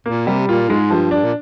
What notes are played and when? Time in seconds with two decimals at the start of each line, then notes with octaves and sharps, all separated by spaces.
0.06 A#2 A#3
0.27 C3 G3
0.48 A#2 F4
0.69 G#2 G#3
0.90 G2 F3
1.11 G2 D4
1.24 A#2